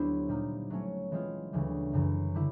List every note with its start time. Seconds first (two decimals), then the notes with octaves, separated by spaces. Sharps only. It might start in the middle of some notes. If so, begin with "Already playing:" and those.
Already playing: D2 F#3 B3 D4 E4 G4 C5
0.28 A#2 G3 A#3 D#4
0.70 F#3 A3 C#4
1.12 E3 G#3 C4 F4
1.53 D2 C#3 E3 G3
1.93 F#2 C#3 E3
2.34 D3 G3 E4